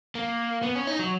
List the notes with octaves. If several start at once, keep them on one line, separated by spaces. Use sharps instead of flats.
A#3
B3
C#4
D#4
F#3